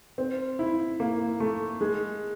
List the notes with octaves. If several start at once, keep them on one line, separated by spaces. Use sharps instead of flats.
C4
E4
A#3
A3
G#3